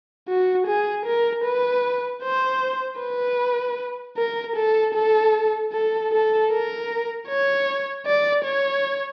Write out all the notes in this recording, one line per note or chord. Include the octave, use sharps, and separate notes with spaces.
F#4
G#4
A#4
B4
C5
B4
A#4
A4
A4
A4
A4
A#4
C#5
D5
C#5